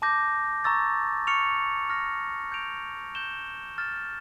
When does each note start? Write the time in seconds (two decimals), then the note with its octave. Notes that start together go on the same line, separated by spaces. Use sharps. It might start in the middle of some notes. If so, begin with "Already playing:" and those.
0.02 A5 D6 G6 A#6
0.64 A#5 C#6 E6 A6
1.27 C#6 F6 C#7 F7
1.89 C#6 F6 A#6
2.52 G6 D7 F7
3.15 G6 A#6 E7 G7
3.78 F6 A6 E7